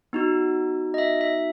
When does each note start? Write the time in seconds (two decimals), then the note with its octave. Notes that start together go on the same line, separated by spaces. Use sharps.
0.13 B3 D#4 F#4
0.94 D#5
0.98 E5
1.21 E5